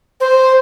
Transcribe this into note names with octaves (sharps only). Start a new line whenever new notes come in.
C5